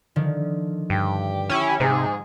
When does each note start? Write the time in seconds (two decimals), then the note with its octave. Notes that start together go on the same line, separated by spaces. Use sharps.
0.16 D3 D#3 F3
0.90 G2 G4
1.49 C#4 E4
1.80 G#2 C3 G#4